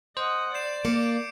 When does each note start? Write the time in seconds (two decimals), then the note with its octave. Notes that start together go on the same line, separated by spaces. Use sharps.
0.17 C5 D#5 F#5
0.54 D5 G6 C7 E7
0.85 A#3 D6 C#7 D7